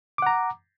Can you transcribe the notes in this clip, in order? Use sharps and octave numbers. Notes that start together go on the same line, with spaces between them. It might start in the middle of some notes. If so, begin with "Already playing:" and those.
F#5 A#5 D6